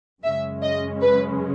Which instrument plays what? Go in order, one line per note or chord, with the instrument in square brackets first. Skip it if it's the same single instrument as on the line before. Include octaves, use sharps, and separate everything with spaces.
[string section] F#2 C#3 G#3 C#4 E5
D#5
B4